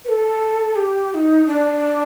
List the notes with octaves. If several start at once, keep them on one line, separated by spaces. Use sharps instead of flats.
B4
A4
G4
G4
D#4
D4